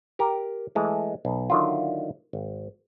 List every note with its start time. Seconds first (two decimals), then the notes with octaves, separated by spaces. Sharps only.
0.19 G4 A#4
0.75 E3 G#3 A3
1.25 B1
1.50 D3 D#3 F#3 E4 F4
2.33 G#1